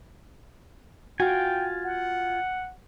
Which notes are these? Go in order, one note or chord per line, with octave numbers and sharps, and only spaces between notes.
F4 F#4 G5 G#5
F#5